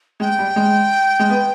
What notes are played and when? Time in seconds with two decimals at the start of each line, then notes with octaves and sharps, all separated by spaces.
0.20 G#3 G5
0.39 G3
0.56 G#3
1.20 G#3
1.30 B3